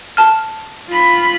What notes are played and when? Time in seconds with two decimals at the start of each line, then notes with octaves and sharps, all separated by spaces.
0.17 A5 F6
0.88 F4 B5